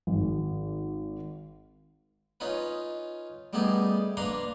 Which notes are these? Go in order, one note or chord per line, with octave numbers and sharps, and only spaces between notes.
G#1
C#4 D#4 F4 B4
G3 A3 B3 D#4 G4 G#4
A#3 D4 B4 A#5 C6